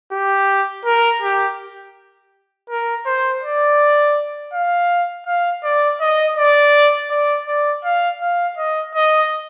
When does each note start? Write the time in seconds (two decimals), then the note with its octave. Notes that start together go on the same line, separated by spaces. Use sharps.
0.12 G4
0.86 A#4
1.22 G4
2.70 A#4
3.06 C5
3.43 D5
4.53 F5
5.27 F5
5.64 D5
6.01 D#5
6.37 D5
7.11 D5
7.47 D5
7.84 F5
8.21 F5
8.57 D#5
8.95 D#5